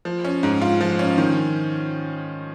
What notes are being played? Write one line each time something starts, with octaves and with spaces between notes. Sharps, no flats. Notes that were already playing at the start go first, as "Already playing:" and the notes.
F3
C#4
G#2
F4
F3
C#4
D#3